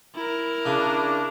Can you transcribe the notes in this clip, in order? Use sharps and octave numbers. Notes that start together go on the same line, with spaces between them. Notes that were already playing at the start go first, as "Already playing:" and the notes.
E4 A#4
C#3 D4